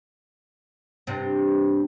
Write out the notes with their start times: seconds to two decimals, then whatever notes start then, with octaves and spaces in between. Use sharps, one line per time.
1.07 G2 C3